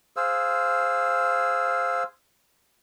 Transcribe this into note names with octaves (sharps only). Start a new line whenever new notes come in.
G#4 C5 F5 E6